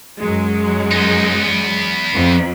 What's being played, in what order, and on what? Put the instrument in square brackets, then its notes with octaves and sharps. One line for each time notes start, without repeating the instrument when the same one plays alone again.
[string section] F#2 F#3 G#3
[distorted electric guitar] B3 D#4
E2 B3
[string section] F2